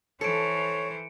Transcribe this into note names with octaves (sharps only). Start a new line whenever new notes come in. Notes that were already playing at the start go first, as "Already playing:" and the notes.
E3 A4 C5 C#5 C#7 D7